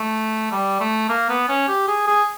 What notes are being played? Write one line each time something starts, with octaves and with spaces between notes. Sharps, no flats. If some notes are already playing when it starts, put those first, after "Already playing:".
Already playing: A3
G3
A3
A#3
B3
C#4
G4
G#4
G#4